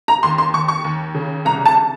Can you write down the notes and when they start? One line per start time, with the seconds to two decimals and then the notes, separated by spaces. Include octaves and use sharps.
0.08 A#5
0.23 D#2 C6
0.38 C6
0.53 D#2 C#6
0.68 C#6
0.84 D#2
1.14 C#3
1.45 C2 A#5
1.65 A5